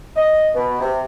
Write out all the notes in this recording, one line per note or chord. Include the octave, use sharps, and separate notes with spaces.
D#5
B2
C3